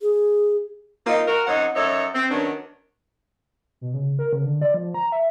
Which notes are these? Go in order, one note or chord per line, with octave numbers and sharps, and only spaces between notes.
G#4
A#3 C4 D#4 F4
F#4 A#4
F#2 C4 D#4 C#5 F#5
F#2 D#4 A4 C#5 E5
C4
D#3 F#3 B3 C#4 D4
B2
C#3
A#4
C#3
D3
D5
F3
A#5
E5